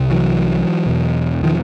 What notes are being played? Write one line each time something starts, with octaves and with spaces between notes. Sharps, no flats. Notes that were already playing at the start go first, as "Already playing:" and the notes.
Already playing: C2 C3
E3 F#3
E2 B2
D#3 F3